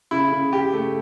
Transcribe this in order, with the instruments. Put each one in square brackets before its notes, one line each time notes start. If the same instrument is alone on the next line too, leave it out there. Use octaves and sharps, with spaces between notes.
[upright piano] C#3 [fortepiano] E4
[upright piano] C#3
[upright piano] C#3 [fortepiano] G4
[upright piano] A3